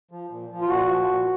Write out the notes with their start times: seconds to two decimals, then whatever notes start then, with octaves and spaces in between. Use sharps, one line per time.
0.11 F3
0.30 A#2
0.50 F3
0.62 F4
0.69 A#2 F#4
0.89 F3
1.08 A#2